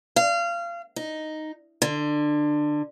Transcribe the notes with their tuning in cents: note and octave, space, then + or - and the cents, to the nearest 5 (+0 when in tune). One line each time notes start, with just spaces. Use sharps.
F5 -25
D#4 +0
D3 +20